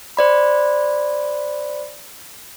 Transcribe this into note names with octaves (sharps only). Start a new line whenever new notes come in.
C5 D5 B5